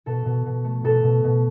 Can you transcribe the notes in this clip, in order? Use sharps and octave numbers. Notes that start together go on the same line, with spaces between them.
B2 A4
B2
B2
A3
B2 A4
B2
B2